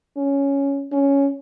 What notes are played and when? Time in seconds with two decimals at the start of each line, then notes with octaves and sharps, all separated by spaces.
0.17 C#4
0.92 C#4